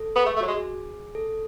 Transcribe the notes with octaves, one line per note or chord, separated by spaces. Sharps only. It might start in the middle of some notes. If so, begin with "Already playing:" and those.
Already playing: A4
B3
A3 G#4
A3
F#3 F#4
G#3
G#4
A4